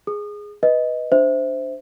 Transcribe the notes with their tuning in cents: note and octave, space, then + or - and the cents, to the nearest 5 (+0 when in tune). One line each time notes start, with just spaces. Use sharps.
G#4 +0 D#6 -35
B4 +0 D#5 +5
D4 +0 C5 -10 E5 -10